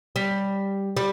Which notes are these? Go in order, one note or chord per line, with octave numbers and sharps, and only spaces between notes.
G3
G3